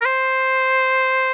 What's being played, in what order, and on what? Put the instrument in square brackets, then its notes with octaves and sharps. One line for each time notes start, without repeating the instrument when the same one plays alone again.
[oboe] A#4
C5